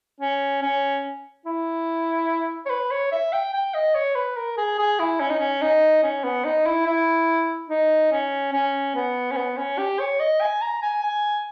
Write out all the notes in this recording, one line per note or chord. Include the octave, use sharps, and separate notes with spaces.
C#4
C#4
E4
C#5
B4
C#5
E5
G5
G5
D#5
C#5
B4
A#4
G#4
G#4
E4
C#4
D#4
C#4
D#4
C#4
B3
D#4
E4
E4
D#4
C#4
C#4
B3
C#4
B3
C#4
G4
C#5
D#5
G#5
A#5
G#5
G#5